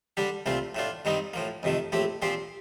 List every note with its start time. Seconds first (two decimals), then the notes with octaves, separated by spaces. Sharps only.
0.17 D3 G3 D4 G4
0.46 C2 A#2 A3 C4 F4
0.75 A2 A3 D4 F4
1.05 G2 D#3 G3 C4 D#4
1.34 A2 F3 A#3
1.63 F2 C3 D#3 A3
1.92 A#1 A2 A3 C4 G4
2.22 A#2 F3 C4 G4 C5